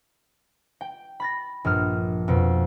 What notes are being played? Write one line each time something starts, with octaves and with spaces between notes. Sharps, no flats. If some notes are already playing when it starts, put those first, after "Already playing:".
G5
B5 A6 A#6
A#1 G2 D#6 F6
F2 B2